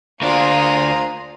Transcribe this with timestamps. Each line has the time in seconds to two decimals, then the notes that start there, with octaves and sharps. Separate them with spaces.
0.22 D2 A#3 D4 F4 G#4 C5 A#5